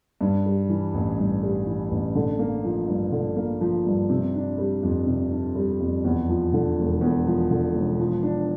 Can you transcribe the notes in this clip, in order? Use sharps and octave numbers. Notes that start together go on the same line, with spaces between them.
G2
G3
E3
A1
G2
G3
E3
A1
D3
A#3
F3
G2
D3
A#3
F3
G2
C3
D4
G3
F2
C3
D4
G3
F2
E2
F3
D3
E1
E2
F3
D3
E1
F3
D4